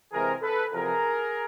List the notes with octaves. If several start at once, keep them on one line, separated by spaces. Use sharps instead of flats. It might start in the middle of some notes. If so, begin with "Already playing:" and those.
C3 E3 G#3 C4 G#4 A#4
A4 B4
E2 C3 F3 G#4 A#4